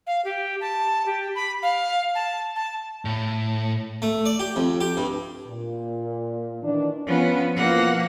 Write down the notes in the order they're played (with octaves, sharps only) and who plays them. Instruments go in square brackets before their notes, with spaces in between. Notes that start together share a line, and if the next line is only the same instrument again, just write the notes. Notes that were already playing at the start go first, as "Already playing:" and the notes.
[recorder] F5
G4
A5
G4
B5
F5
A5
A5
[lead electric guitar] A2
[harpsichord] A3
D5
G4
F2
G4
G2
[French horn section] A#2
D#3 E3 D4
[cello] F3 B3 [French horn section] C#4
[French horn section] B2 E3 F3 [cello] A#3 F#5